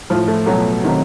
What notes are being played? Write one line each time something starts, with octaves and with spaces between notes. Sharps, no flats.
A2 F3
A3
B2 F#3 A3
C3 D#3 F#3